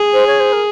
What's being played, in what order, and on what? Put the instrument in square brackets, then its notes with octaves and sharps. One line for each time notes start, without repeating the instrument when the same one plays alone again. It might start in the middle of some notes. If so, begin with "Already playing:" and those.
Already playing: [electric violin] G#4
[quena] C5
C#5
C5
A#4